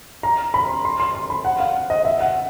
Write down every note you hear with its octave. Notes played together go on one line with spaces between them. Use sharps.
A#5
B5
C6
C6
C6
C6
B5
F#5
F5
D#5
E5
F#5